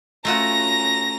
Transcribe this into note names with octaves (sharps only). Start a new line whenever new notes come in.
A3 C#4 F4 F#4 A#5 A#6